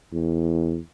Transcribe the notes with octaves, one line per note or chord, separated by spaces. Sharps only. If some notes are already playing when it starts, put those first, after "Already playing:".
E2